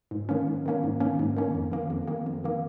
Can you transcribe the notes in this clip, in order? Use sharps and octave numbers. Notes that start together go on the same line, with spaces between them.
G#2
D#3 A#3 C#4
G#2
D#3 A#3 C#4
G#2
D#3 A#3 C#4
G#2
D#3 A#3 C#4
F2
D#3 A#3
F2
D#3 A#3
F2
D#3 A#3